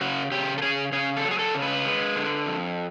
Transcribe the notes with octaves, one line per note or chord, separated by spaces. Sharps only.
C#3 F#4
C#3 G4
A4
C#3 G#4
C#3 G#4
A4
F#3
G#4
A4
C#3
B4
G#3
D3
F2